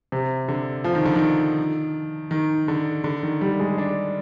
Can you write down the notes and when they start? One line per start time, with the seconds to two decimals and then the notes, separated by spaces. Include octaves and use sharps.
0.12 C3
0.48 D3
0.84 F3
0.95 D#3
1.05 D3
1.16 D#3
2.31 D#3
2.68 D3
3.04 D3
3.23 D#3
3.41 G3
3.60 G#3
3.78 D4